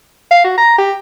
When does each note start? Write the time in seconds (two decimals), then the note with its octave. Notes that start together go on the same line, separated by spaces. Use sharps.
0.31 F5
0.45 F#4
0.58 A#5
0.78 G4